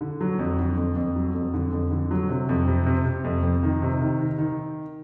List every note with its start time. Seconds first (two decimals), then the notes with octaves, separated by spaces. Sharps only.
0.01 D3
0.21 F#3
0.39 F2
0.58 D3
0.77 F2
0.96 F2
1.16 F#3
1.35 F2
1.54 D3
1.72 F2
1.91 D3
2.11 F#3
2.29 C3
2.49 F2
2.67 C3
2.86 C3
3.06 C3
3.24 F2
3.43 F2
3.63 D#3
3.82 C3
4.01 D#3
4.20 D#3
4.38 D#3